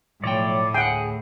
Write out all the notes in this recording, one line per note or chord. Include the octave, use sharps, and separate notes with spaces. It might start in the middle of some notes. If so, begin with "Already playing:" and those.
B1 A2 F3 C#5 D5 G5
D2 G#4 F#5 G5